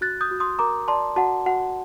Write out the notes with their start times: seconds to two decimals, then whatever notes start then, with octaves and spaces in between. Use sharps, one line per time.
0.01 F#4 F#6 A6
0.21 D#6 G6
0.31 F#4
0.40 C6 D#6
0.59 A#4 A#5 D6
0.88 D5 A5 C6
1.16 F#4 F#5 A5
1.46 F#4 F#5